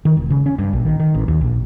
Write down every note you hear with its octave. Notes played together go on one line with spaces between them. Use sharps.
D#3
E1
C#3
C#4
G2
A#1
D#3
D#3
A1
D#2
A#1